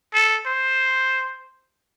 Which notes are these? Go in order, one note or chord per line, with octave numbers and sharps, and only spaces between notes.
A4
C5